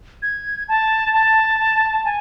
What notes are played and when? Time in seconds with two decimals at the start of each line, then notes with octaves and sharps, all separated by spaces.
0.22 G#6
0.69 A5
1.13 A5
2.05 G#5